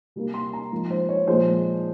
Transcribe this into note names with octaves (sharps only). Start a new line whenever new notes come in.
C3 G3 A#3
C6
A#5
G#2 F3 A#3
C5
C#5
A#2 F3 G#3 C5